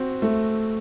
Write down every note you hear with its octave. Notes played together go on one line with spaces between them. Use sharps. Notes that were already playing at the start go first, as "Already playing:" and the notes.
Already playing: C4 F#4
A3